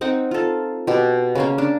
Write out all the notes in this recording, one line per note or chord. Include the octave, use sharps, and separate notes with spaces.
C4 D#4 F#5 G5
F4 A4
B2 G4
C#3 A#3 C#4
D4